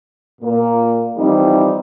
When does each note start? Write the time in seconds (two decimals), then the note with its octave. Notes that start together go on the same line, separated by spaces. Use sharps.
0.42 A#2 A#3
1.17 E3 F3 G3 C4 D#4